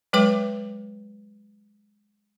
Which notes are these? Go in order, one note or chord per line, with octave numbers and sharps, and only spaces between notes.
F#3 G#3 B4 G5 D6